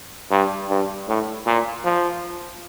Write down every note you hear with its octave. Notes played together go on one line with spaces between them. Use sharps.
G2
G2
A2
A#2
F3